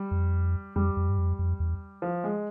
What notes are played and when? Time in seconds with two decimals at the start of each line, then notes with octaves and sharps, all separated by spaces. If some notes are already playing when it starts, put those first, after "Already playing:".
Already playing: G3
0.11 F2
0.76 F2 G3
0.97 F2
1.09 G2
1.18 F2
1.39 F2
1.60 E2
2.02 F3
2.24 G#3